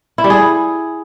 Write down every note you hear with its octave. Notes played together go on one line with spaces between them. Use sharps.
E4
G3
G#4